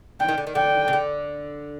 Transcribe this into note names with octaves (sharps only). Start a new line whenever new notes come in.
D3 G5
D#3
D3
D#3
D3 G5
C#3
D3